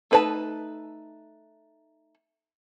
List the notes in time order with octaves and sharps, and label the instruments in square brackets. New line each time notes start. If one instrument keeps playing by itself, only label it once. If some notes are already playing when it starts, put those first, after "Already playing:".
[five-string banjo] A3 D#4 B4 D5 A5